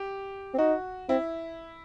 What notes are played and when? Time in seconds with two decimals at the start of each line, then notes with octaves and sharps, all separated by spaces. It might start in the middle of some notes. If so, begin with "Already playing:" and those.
Already playing: G4
0.54 C4
0.58 D#4 F#4
1.09 C4 E4